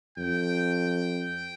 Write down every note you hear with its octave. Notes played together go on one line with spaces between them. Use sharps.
F2 G5